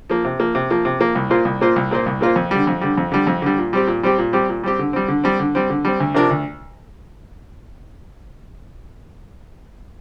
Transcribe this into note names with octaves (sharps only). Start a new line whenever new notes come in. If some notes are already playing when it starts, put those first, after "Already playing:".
F3 A#3
C3
F3 A#3
C3
F3 A#3
C3
F3 A#3
C2
A#2 A#3 F4 C5
C2
A#2 A#3 F4 C5
C2
A#2 A#3 F4 C5
C2
A#2 A#3 F4 C5
F2
D3 G3
F2
D3 G3
F2
D3 G3
F2
D3 G3
A#2
G3 C4 G4
A#2
G3 C4 G4
A#2
G3 C4 G4
A#2
G3 C4 G4
D3
G3 C4
D3
G3 C4
D3
G3 C4
D3
G3 C4
D2
C3 F3 D4 A#4
D2